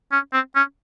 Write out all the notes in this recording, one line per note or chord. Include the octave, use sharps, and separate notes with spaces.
C#4
C4
C#4